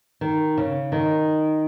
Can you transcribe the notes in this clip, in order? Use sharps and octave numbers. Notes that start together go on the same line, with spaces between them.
D#3
C#3
D#3